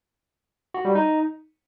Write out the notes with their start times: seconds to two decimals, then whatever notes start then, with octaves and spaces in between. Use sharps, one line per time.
0.74 F#4
0.85 G3
0.95 D#4